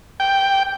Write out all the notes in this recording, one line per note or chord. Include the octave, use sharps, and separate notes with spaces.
G5